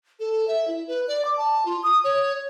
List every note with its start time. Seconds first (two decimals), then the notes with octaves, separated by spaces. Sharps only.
0.20 A4
0.48 E5
0.68 E4
0.88 B4
1.08 D5
1.25 D6
1.37 A5
1.65 F4
1.83 D#6
2.04 C#5